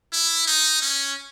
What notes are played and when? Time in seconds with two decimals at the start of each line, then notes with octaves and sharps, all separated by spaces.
0.13 E4
0.47 D#4
0.82 C#4